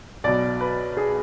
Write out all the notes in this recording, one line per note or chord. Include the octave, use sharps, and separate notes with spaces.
B1 B2 D5
B4
G#4